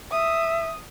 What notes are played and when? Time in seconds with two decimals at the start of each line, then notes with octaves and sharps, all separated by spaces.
0.12 E5 D#6